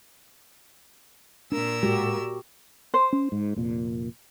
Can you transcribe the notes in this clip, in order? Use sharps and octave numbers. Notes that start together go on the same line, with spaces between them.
A#2 D4 A#4 E6
A2 G#3 F#4 G4
C5
C#4
G#2
F1 A#2